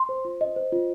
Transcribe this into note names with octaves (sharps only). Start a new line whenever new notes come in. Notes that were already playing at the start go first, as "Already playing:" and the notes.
Already playing: C6
C5
F4
D#5
C5
F4